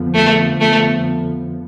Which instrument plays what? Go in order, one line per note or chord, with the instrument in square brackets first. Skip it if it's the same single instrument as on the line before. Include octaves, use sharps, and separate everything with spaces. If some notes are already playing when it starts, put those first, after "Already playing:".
Already playing: [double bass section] F2 D3 F3 B3
[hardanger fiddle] A3
A3